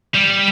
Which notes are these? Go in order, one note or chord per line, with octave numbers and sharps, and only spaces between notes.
G3